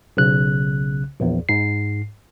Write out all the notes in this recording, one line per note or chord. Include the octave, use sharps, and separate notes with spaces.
B1 C#3 F#6
A#1 E2
G#2 C7